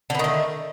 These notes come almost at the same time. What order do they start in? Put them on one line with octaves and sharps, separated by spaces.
D3 B3 D#3 A3